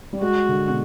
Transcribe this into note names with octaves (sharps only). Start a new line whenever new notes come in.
G3
G#3 F#4
D3
B2